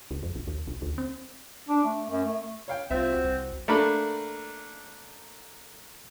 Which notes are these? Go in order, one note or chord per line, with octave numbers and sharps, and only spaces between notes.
C#2
F2
B1
D#2
B1
D2
C4
D4
A3
F#2
A3
C#5 F5 G5
C2 C4 F4 E5
F#4
C2
A3 A#3 D4 B5